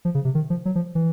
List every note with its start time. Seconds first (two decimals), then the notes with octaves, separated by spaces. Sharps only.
0.05 F3
0.15 C#3
0.25 C3
0.35 D#3
0.50 F3
0.65 F#3
0.75 F3
0.95 E3